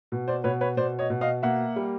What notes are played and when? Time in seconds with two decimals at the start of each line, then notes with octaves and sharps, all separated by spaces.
0.12 B2
0.28 C5 D5
0.44 B2 B4 C#5
0.61 B4 C#5
0.77 B2 C5 D5
0.99 C#5 D#5
1.10 B2
1.21 D#5 F5
1.43 A#3 E5 F#5
1.76 G3